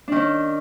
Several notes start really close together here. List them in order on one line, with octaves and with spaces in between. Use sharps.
D4 D#3 C#4